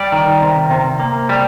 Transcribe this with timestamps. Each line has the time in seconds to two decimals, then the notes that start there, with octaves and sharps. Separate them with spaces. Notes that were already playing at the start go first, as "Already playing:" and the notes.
Already playing: G3 D5
0.12 D#3
0.42 C3
0.71 C3
1.00 A#3
1.29 G3